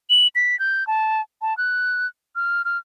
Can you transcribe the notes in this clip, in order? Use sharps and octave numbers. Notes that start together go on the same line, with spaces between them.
F#7
B6
G6
A5
A5
F#6
F6
F6